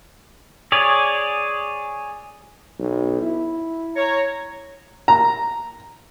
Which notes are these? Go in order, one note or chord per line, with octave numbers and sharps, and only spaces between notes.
G#4 C#5 D5
B1
E4
C#5 A#5
A#5